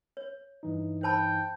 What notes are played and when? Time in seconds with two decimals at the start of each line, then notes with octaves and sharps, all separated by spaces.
0.17 C#5
0.63 G2 E3 D#4
1.03 C5 G5 A5 B5